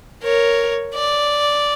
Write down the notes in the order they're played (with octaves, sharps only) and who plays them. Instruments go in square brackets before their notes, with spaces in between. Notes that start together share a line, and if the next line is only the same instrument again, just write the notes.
[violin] A#4 [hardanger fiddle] C#5
[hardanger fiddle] D5